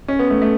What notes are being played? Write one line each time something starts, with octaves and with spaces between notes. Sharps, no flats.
C#4
B3
A3
A3